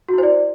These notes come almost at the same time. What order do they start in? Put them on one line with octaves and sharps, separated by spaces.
F#4 E4 C5 D5